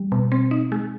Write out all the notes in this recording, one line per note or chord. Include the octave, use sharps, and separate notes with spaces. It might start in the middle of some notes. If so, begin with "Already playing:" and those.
Already playing: G3
B2
C4
D#4
G#3